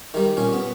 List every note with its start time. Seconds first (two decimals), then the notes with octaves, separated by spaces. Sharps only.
0.14 D#3 G3
0.37 A#2 C#4
0.53 B3